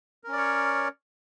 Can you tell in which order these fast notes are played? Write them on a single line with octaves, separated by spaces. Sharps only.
A#4 C#4 D5 C#5